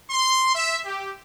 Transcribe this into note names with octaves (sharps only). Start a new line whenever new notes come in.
C6
E5
G4